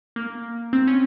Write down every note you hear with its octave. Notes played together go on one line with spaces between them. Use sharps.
A#3
C4
C#4